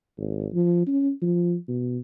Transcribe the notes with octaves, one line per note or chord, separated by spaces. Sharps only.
G#1
F3
C#4
F3
B2